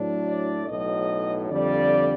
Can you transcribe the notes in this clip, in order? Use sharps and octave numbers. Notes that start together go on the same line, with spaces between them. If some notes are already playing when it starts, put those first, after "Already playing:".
Already playing: A2 F#3 A3 D4
D5
B1 A2 F#3 D#5
F2 D3 G3 D5